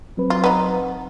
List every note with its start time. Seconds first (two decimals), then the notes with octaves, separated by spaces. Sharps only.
0.17 F#3 C4 B4
0.30 F4
0.44 B3 D#4